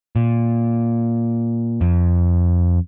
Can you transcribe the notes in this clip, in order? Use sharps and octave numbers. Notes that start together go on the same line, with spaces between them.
A#2
F2